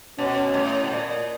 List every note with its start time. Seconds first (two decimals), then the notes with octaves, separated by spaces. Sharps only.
0.18 B2 C#4
0.54 A2
0.84 B2
0.91 A#2